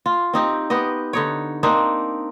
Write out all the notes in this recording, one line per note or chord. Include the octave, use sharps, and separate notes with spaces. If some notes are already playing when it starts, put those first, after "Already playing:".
F4
C4 D#4 G4
B3 G4 D#5
D3 D#4 C#5
A#3 C4 D4 D#4